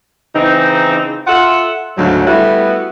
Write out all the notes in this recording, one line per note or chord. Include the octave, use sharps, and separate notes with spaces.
C#3 E3 C4 D#4
F4 A4 E5 F#5
D2 G#2 C#3 F#3
G3 A3 B3 E4 F#4